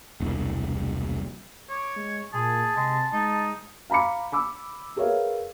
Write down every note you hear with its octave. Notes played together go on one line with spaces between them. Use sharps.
E1 C2
C#5 D6
G#3
A#2 G#4 A5
C3 G#3
G#3 D#4
F5 A#5 B5 D6 C#7
B5 D6 E6
G#4 A#4 B4 C#5 E5 F5